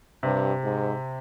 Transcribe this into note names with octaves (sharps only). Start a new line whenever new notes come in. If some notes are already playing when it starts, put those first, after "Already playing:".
G2 C3
G#2